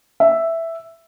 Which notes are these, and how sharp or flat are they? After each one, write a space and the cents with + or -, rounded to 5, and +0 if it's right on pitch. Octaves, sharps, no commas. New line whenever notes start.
E5 +0